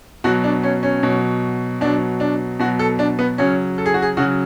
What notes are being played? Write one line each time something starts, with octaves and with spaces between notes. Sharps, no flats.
B2 F#3 F#4
D4
C#4
C#4
B2 F#3
B2 F#3 D4
D4
B2 F#3 F#4
A4
D4
B3
C#3 F#3 C#4
A4
G#4
F#4
G#4
C#3 F#3 F#4